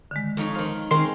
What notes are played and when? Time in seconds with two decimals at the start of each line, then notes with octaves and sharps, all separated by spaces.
0.11 D3 D#3 G#3
0.37 F2 D#4 C#5
0.55 D#3 F4 C5
0.91 D#3 G#3 C4 C#4 C6